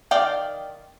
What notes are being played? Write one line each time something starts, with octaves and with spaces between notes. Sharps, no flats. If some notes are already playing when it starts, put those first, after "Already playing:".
D#3 D5 F5 G5